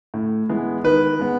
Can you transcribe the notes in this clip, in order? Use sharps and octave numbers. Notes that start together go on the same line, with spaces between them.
A2
E3 G#3 B3
D#3 B4
G#3 B3